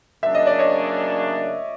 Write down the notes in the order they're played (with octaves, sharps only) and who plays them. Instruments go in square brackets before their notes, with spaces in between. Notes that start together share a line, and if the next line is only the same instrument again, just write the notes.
[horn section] C#3 F#3 A#3 D4 [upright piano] E5
[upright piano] D#5
D5
C#5 D#5